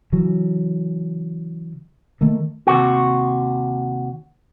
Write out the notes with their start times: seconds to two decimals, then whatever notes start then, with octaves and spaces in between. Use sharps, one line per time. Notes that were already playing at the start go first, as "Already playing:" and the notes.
0.12 C#3 E3 F#3
2.21 D#3 A3 A#3
2.67 D#2 G#2 C3 F#4